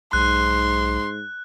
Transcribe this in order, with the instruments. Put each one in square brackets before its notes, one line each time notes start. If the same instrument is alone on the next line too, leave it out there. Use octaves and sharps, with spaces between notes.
[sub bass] B1 [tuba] G#2 [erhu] C6 [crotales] F#6